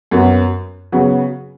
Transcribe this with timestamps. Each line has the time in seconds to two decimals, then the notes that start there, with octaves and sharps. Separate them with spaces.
0.11 F#2 F#3 B3
0.92 C#3 F#3 B3